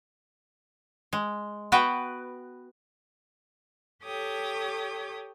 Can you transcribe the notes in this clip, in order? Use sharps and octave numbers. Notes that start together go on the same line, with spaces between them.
G#3
B3 F#4 B4 F#5 G5
G4 A4 C#5 G5 D#6